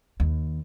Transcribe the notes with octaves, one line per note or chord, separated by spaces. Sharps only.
D#2